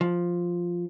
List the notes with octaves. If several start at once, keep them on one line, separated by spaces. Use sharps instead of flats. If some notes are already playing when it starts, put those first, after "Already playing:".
F3